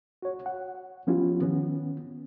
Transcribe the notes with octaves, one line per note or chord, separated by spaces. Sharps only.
F#4 C#5
F#5
F3 B3 C#4 E4 F4 G4
D#3 B3 C#4